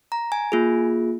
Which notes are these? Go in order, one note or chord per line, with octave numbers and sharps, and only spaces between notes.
A#5
G#5
A#3 F4 G#4